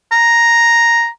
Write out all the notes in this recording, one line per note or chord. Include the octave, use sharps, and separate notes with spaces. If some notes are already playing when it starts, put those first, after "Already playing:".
A#5